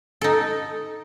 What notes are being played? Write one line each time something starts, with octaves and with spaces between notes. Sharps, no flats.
D#4 A4